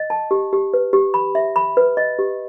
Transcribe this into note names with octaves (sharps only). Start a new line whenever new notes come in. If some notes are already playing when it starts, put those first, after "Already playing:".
Already playing: D#5
A5
G4
G4
B4
G4
B5
E5
B5
B4
D#5
G4